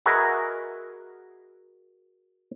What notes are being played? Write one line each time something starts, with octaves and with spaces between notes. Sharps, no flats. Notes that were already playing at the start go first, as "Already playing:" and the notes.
F#4 G#4 A#4 B4 D#5 E5